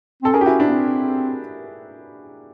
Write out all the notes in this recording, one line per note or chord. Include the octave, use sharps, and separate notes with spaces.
C4 A4
C#4 G#4 A#4
G4
E4 F#4
D4 E4
B3
C4